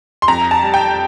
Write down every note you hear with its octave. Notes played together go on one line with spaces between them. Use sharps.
C6
F2 A#5
A5
G3
G5